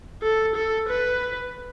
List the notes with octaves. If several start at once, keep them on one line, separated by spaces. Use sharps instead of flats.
A4
A4
B4